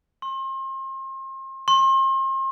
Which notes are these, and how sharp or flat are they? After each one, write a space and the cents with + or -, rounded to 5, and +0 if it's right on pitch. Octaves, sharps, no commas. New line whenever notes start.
C6 +35
C6 +40